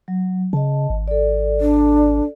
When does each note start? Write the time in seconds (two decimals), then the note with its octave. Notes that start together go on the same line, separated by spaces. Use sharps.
0.08 F#3
0.53 C#3 D#5 A5
0.90 G#1
1.08 A4 D5
1.61 D4